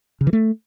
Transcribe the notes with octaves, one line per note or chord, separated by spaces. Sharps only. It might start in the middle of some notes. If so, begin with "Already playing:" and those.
C#3
E3
A3